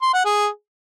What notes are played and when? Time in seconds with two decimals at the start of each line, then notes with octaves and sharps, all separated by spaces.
0.02 C6
0.14 F#5
0.25 G#4